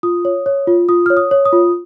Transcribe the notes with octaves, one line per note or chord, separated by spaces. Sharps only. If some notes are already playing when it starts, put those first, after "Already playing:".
F4 D#6
C#5
C#5
F4
F4 D#6
C#5 F6
D#6
C#5
D#6
F4